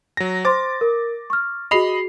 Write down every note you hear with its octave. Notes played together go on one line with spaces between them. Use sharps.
F#3 A#6
C5 C6 D6 A6
A#4
C#6 F6
F#4 G#4 D#5 B5 C7 F7